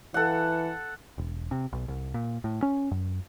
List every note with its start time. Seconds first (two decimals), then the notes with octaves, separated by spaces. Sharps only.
0.14 E3 A4 F#5
1.18 E1
1.51 C3
1.72 B1
1.88 C2
2.14 A#2
2.44 A2
2.62 C#4
2.91 F#2